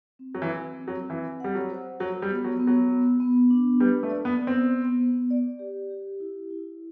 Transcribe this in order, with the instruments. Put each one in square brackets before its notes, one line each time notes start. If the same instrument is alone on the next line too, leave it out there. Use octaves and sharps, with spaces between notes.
[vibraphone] C4
[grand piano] F#3
E3
[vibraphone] F#4
C4
[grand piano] F#3
[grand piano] E3 [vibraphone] C4
[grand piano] G3 [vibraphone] F#5
[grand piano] F#3
[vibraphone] C5
[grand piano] F#3 [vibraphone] F#4
[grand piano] G3
[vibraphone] B3
[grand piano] F#3
[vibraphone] B3
[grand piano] F#3
[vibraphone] B3
B3
D4
[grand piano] G3 [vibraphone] B4
[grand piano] A3
[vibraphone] D5
[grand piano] B3
[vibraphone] B3
[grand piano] C4
[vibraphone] B3
B3
D5
G4
G4
E4
E4